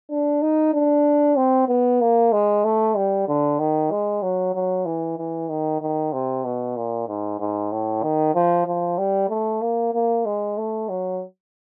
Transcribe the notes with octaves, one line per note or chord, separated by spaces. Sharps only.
D4
D#4
D4
C4
B3
A#3
G#3
A3
G3
D3
D#3
G#3
F#3
F#3
E3
E3
D#3
D#3
C3
B2
A#2
G#2
G#2
A2
D#3
F3
F3
G3
A3
A#3
A#3
G#3
A3
F#3